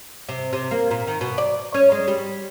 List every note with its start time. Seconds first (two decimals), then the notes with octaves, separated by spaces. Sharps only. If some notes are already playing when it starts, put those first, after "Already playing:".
0.29 C3
0.53 C3
0.71 A#3
0.91 A#2
1.07 D#3
1.21 B2
1.38 D5
1.74 C#4
1.92 G#3
2.08 G3